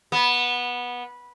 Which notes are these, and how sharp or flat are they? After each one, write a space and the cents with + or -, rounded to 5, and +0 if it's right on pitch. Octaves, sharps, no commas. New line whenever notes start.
B3 -15